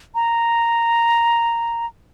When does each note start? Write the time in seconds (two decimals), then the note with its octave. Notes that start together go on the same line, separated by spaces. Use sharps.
0.15 A#5